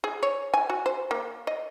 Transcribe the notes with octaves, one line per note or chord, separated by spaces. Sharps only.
G#4
C#5
G#5
F#4
C5
A#3
D#5